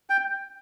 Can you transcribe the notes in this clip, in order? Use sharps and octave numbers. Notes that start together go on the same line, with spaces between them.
G5